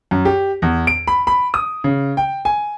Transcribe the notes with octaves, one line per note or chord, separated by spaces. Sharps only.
F#2
G4
E2
D7
B5
B5
D#6
C#3
G5
G#5